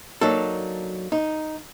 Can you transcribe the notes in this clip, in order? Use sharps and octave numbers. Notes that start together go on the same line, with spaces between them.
F#3 A#3 D4 D#4 A4
D#4